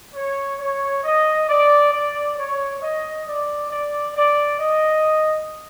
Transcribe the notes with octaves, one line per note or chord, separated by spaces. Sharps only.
C#5
C#5
D#5
D5
D5
C#5
D#5
D5
D5
D5
D#5